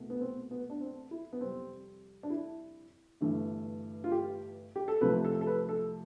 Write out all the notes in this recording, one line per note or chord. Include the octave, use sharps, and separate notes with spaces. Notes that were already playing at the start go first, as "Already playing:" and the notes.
Already playing: C2 B2 A3
B3
C4
B3
D4
C4
E4
B3
F2 C3 G3 C4
D4
E4
G1 G2 E3 A3
F4
G4
G4
A4
C2 C3 F3 A3 B4
A4
A4
B4
A4